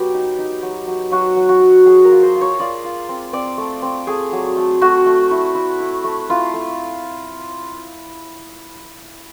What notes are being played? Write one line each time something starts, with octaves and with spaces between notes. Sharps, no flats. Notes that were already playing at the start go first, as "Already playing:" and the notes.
Already playing: F#3 B3 G4
D#4
D#4
F#3
F#3
F#3 F#4
F#3
F#4
F#3
F#3 G#4
A#4
F4
C5
F4
C#5
F4 D5
F4
C4
C4 D5
A3
C4
A3 G#4
F#3
A3
A3 F#4
A3
E4
E4
E4
A3
E4 F4
A3